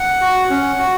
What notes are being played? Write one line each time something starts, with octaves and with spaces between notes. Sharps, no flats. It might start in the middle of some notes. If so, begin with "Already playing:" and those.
Already playing: F#5
F#4
C#4
F#4